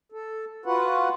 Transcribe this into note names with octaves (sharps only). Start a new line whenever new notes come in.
A4
F4 F#4 B4 F#5